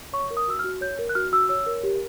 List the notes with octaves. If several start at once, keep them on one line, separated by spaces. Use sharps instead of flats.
C#5 C#6
A#4
D#6
F#4 E6
F6
F#4
C#5 G6
A#4
F#6
F#4 F6
F#4 E6
C#5 E6
A#4
G4